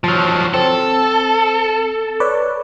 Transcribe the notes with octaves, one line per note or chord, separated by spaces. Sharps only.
F3 F#3 A5 F6
C4 A4
B4 C#5 D5